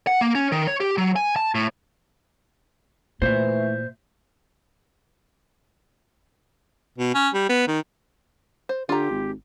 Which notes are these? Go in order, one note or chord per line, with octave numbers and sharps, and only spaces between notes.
F#5
A#3
C#4
D#3
C#5
G4
F#3
G#5
A5
A2
A#2 E3 A3 C5 E5
B2
C#4
G3
B3
D#3
C5
D3 F4 G4 A#5
G#1